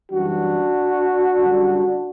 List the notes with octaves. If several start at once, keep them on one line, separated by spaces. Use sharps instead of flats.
F#2 E3 G3 D4 F#4
F#2 D3 G3